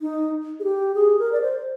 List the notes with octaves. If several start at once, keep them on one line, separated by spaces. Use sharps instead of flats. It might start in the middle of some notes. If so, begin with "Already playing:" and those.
D#4
G#4
G4
G#4
A#4
D5
C5